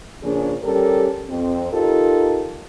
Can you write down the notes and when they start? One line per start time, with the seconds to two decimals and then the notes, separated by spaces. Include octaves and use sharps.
0.22 C#3 F3 A#3 D4 G#4
0.63 G3 C#4 G4 A4 A#4
1.29 F2 C4
1.71 D#4 F4 G4 A4 A#4